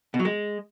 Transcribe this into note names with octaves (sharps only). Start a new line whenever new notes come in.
B2
F#3
G#3